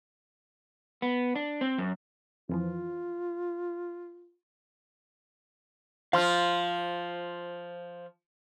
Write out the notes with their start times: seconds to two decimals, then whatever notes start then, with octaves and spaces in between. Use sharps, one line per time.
1.02 B3
1.36 D4
1.61 C4
1.78 F#2
2.49 F2 E3 F3 F4
6.13 F3 F4 F5 C6 F6